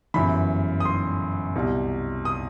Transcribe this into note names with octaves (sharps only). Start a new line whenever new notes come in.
G1 F#2 E3 B5
D#6
C6
C2 B2
D#6